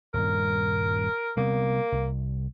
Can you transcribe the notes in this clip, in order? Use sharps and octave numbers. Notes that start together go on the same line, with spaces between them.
D#1 G2 A#4
C3 G3 A#3 B3
C2